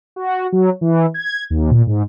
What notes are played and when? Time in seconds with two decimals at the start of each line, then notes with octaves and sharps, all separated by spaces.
0.16 F#4
0.52 F#3
0.81 E3
1.14 G#6
1.50 D#2
1.71 A#2
1.87 G#2